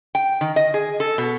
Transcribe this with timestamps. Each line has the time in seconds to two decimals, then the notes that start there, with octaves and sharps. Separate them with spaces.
0.15 G5
0.41 D#3
0.56 D#5
0.74 G#4
1.00 A4
1.18 B2